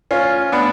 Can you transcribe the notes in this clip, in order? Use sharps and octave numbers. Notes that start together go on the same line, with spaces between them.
C#4 F4
B3 D4